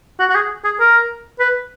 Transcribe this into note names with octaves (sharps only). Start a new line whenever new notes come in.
F#4
F#4
G#4
G#4
A#4
B4